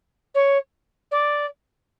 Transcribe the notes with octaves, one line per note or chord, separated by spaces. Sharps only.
C#5
D5